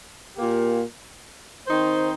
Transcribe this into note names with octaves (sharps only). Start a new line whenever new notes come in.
A#2 A#3 G4
D#3 C4 D#4 C5